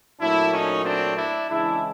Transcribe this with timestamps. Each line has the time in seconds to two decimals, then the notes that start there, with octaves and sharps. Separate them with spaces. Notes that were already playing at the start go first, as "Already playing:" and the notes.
0.20 A#2 F#3 A3 D4 E4
0.52 C#4 D#4
0.84 C4 D4
1.17 D4 E4
1.49 C#3 E3 G#3 D4 E4